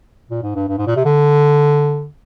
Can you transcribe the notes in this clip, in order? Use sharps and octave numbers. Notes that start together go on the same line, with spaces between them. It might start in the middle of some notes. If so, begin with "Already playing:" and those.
A#2
G#2
G2
G2
G#2
A#2
C3
D3